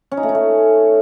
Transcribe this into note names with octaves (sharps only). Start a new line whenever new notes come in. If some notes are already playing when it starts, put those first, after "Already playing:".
C#4
D#4
A3
D#4
A3